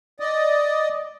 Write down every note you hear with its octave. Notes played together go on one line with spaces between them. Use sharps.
D5 D#5